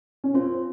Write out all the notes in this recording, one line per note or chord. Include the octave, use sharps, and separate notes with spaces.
C#4
C4 F4